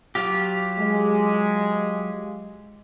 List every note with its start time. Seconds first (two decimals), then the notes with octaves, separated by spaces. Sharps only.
0.15 F#3 F4 G4
0.78 G#3